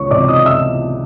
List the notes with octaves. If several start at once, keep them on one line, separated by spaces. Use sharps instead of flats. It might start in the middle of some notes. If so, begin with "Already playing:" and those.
Already playing: C#2 C#5 C#6
C3 F3 D5 D6
D#5 D#6
E5 E6